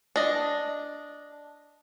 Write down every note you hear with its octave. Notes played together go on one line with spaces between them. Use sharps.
D4 D#5